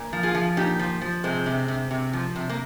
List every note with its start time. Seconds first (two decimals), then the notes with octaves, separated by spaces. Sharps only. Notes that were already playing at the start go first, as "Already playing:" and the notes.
Already playing: A#2
0.13 F3
0.23 F4 G#4
0.35 F3
0.57 A#2 D#4 G4
0.79 F3
1.01 F3
1.24 C3 G#3 C4
1.46 C3
1.68 C3
1.91 C3
2.13 F3
2.36 C3
2.49 A#3